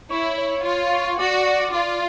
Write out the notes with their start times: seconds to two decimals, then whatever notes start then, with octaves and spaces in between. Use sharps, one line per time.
0.10 E4 C#5
0.38 C#5
0.64 F4 C#5
0.92 C#5
1.18 F#4 D5
1.46 D5
1.72 F4 D5